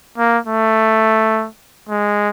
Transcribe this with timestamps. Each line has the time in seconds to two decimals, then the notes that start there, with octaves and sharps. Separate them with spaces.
0.18 A#3
0.47 A3
1.89 G#3